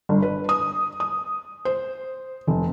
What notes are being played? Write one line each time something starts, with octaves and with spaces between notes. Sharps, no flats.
G1
B4
D#6
D#6
C5
F1